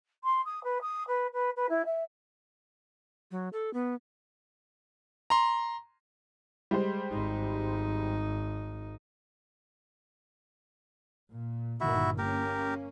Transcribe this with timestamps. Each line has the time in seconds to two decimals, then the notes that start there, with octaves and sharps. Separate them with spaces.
0.24 C6
0.45 D#6
0.64 B4
0.82 D#6
1.08 B4
1.33 B4
1.57 B4
1.70 E4
1.85 E5
3.31 F#3
3.53 A4
3.74 B3
5.30 A#5 C6
6.71 G3 G#3 C5
7.12 G#1 D#4
11.30 A#2
11.81 G1 A#2 D#3 E4 F#4 E5
12.18 A#3 C#4 G4 A#4